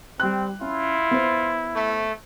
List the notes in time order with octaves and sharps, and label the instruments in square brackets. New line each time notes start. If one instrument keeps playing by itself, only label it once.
[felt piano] G3 F#6 [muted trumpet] C4
[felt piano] C#4 [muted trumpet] E4 [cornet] F4
[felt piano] B3 C5
[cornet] A3